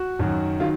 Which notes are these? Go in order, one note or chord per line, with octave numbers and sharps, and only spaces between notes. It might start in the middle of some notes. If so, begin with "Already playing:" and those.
Already playing: F#4
F#2 D#3 F#3
D#3 F#3 F4